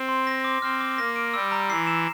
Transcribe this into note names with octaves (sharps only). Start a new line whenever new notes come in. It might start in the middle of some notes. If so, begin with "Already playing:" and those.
Already playing: C4
C6
A#6
D6
C4 F6
D6
A#3 A#6
D7
G3 E6
A#5
E3 C7
E7